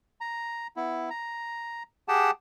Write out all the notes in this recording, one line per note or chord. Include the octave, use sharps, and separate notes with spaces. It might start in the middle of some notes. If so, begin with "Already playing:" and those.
A#5
B3 E4
A#5
G4 G#4 F#5 G5 A5